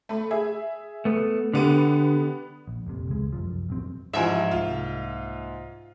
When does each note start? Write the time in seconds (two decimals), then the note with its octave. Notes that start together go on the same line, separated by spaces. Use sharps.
0.09 A3 B5
0.31 G#4 E5
1.05 A3 B3
1.54 D3 G3 B3 D#7
2.67 A#1
2.86 F1 A#1 C3
3.09 C#2 G#3
3.32 C2 F#2 F3
3.69 E1 A#1 F#3 C4
4.13 A1 G#2 F3 E5 G#5
4.51 C2 A#3 F4